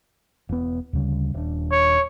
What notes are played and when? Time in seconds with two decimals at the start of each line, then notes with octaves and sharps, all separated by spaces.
0.49 E1 B3
0.93 D2 C#3 G3
1.34 D#1 D4
1.71 C#5